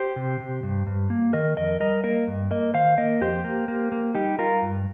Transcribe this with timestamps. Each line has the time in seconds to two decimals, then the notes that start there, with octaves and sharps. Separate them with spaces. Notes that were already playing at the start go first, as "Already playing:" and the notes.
Already playing: G4 C5
0.16 C3
0.40 C3
0.63 G2
0.87 G2
1.10 A#3
1.33 D#3 A#4 D#5
1.57 F2 A#4 D#5
1.80 G3 A#4 D#5
2.04 A#3 A#4 D#5
2.27 G2
2.51 A#3 A#4 D#5
2.74 D#3 C5 F5
2.98 A#3 A#4 D#5
3.21 F2 G4 C5
3.44 A#3
3.68 A#3
3.92 A#3
4.15 G3 D#4 G4
4.38 G3 F4 A#4
4.62 G2